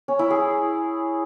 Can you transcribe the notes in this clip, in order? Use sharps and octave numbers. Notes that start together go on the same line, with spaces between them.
C#4
E4
G#4